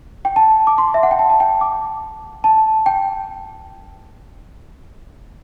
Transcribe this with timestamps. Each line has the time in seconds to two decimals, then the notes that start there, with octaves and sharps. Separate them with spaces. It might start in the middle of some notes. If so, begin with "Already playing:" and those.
0.25 G5
0.36 A5
0.67 D6
0.78 C6
0.94 E5
1.03 F#5
1.11 G5
1.19 A5
1.30 A5
1.40 G5
1.61 D6
2.44 A5
2.86 G5